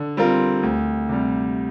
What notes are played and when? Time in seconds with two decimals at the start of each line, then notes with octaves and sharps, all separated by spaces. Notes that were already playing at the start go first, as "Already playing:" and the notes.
Already playing: D3
0.17 G3 C4 F4 A#4
0.63 D2
1.09 C3 G3